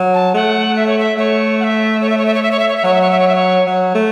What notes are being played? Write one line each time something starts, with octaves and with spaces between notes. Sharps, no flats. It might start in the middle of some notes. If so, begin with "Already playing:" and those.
Already playing: F#3
A5
A3 F#5
E5
C#5
E5
A3 C#5
F#5
E5
C#5
E5
C#5
E5
C#5
E5
C#5
E5
C#5
E5
F#3 C#5
E5
C#5
E5
C#5
E5
C#5
F#3
A3